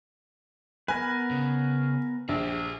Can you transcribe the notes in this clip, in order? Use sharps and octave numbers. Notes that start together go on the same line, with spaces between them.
B3 A#4 B4 G#5
C#3
A#1 G4 G#4